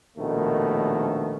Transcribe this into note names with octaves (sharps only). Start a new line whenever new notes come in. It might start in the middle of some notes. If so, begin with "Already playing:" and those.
A#1 D#2 B2 D#3 A3